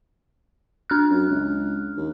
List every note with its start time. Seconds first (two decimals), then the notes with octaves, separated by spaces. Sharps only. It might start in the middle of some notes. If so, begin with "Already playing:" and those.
0.90 D4 F6 F#6
1.10 F#2
1.30 C#2
1.97 D#2